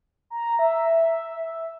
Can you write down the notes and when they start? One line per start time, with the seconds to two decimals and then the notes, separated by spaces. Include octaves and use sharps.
0.30 A#5
0.59 E5